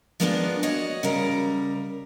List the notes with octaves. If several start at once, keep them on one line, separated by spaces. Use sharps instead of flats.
F3 G#3 A#3 B3 C#4 D4
F#4 C#5 D#5
C#3 G3 A#4